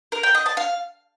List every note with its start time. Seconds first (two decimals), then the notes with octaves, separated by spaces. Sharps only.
0.12 A#4
0.23 G5
0.35 D#5
0.46 A5
0.57 F5